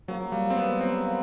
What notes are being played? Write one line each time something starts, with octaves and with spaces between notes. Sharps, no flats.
C#3 F3 F#3 A#3
G3
C4
B3
C#3 F3 A#3 C4